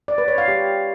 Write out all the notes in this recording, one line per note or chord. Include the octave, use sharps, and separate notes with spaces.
D5
B4
C#5
F5
G4